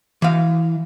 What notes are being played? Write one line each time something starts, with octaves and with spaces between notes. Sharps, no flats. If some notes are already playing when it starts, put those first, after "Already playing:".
E3 F5